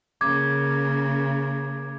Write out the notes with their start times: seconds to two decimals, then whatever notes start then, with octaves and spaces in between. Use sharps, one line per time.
0.21 C#3 A#3 D6 G#6